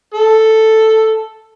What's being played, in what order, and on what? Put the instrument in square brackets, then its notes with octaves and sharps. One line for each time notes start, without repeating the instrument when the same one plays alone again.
[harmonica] A4